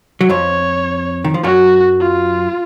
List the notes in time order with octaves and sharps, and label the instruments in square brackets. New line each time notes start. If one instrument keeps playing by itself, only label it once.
[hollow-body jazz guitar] F#3
[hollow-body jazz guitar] F2 F3 [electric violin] C#5
[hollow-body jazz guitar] D#3
F3
[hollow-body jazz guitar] F#2 F#3 [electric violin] F#4
[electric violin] F4